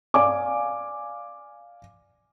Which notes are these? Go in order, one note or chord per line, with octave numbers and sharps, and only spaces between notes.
D5 F5 G#5 D6